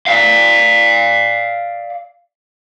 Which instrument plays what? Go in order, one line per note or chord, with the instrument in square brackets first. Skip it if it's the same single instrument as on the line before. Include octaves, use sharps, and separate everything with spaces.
[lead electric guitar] D5 F5